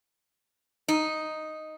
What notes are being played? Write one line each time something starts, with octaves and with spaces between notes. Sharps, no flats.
D#4